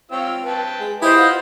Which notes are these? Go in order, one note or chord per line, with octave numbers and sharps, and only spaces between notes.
C4 F4 C#5 E6
B4 G5 A5
G#3
E4 G4 B4 C5 D#5 D#6
F4 F#5